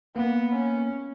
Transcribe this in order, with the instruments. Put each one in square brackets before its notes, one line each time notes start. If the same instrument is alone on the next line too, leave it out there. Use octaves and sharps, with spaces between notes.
[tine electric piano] A#3 [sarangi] B3
[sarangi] C#4